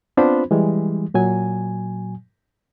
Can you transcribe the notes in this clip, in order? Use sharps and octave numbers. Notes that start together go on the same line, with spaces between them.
B3 C4 D4 F4 C5 B5
E3 G3 G#3
A#2 F#3 G#5